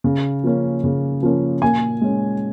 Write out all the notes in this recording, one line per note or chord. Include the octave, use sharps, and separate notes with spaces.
C#3
F3 A#3 C#4
C#3
F3 A#3 C#4
A#2 G#5
G#3 C#4